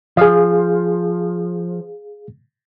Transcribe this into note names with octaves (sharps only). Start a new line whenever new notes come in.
F3 G#4 F5